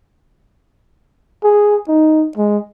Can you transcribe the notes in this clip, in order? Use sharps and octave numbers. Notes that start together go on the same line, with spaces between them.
G#4
D#4
G#3